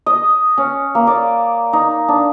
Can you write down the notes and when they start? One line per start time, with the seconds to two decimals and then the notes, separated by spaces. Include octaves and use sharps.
0.06 D#5
0.58 C#4
0.95 A#3
1.07 D5
1.73 D#4
2.08 D4